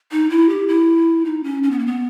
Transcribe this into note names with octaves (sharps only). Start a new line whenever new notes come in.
D#4
E4
G4
E4
D#4
C#4
C#4
B3
A#3
B3